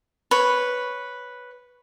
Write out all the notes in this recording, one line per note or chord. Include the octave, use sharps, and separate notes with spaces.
B4 C#5